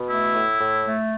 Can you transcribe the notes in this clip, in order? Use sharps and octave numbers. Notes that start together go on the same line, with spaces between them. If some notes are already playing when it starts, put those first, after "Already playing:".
Already playing: B2
A3 E4
A2
A2
A3